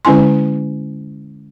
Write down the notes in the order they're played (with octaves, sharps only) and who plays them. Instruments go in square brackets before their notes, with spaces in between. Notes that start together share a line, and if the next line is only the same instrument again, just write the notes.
[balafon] D3 G#3 C#4 E4 G#5 C6